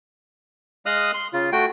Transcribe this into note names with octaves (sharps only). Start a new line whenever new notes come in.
G#3 D#5 F5 D#6 F6 F#6
C6
C#3 F4
A3 F#4 G5